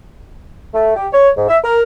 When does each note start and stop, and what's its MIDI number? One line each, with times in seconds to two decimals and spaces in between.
0.74 0.93 57
0.95 1.07 67
1.12 1.29 73
1.37 1.46 44
1.48 1.58 76
1.63 1.82 70